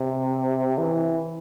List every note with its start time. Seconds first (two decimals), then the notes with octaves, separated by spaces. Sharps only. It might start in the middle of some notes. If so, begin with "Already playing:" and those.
Already playing: C3
0.78 E3